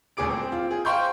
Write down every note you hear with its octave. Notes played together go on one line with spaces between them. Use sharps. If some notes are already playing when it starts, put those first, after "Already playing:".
D#1 D2 G#4 D6 D7
C4
F4
G#4
C5 F5 G5 C6 C#6 G6